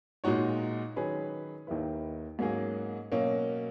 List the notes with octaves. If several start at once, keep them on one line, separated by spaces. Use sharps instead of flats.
A#2 G#3 D#4 F#4 C#5
D#3 F#3 C#4 G#4 B4
D#2 D#3 A#3 E4 B4
G#2 F#3 A#3 C#4 G#4
B2 F#3 A#3 C#4